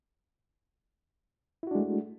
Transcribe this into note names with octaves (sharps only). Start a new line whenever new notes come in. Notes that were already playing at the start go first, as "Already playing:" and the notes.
G#3 A3 D4 E4 F#4